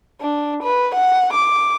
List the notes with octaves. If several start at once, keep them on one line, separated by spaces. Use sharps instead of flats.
D4
B4
F#5
D6